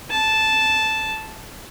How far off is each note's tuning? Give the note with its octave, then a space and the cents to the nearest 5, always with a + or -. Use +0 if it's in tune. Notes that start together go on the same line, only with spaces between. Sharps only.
A5 -5